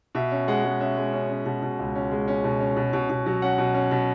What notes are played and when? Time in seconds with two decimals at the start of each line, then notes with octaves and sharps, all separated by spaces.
0.15 B2 E5
0.31 C#4
0.48 G#3 F#5
0.64 G#3
0.80 C#4 E5
0.97 G#3
1.13 C#4
1.30 C#4
1.46 B2
1.62 B2
1.79 C#2
1.95 C#4
2.11 G#3
2.28 C#4
2.44 B2
2.60 C#4
2.77 B2
2.93 B2
3.10 B2
3.26 F#3
3.42 C#4 F#5
3.58 B2
3.74 C#4
3.91 B2